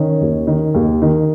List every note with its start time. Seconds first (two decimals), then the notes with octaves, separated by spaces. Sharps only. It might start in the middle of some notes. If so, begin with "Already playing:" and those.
Already playing: D#3 C#4
0.21 D#2
0.47 D#3
0.74 D#2
1.02 D#3